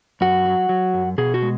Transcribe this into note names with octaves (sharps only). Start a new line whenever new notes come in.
F#2 F#4
F#3
F#3
F#2
B2 G#4
F#4
G#3